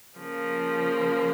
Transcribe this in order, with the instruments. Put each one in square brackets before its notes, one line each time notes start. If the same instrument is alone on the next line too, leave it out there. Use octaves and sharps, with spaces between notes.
[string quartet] C#3 F3 A#3